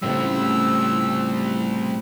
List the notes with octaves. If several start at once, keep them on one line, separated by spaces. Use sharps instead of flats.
C#2 A2 G3 C4 E6